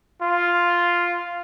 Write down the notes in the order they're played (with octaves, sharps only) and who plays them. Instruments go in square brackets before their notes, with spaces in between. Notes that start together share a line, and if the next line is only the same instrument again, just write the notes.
[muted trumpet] F4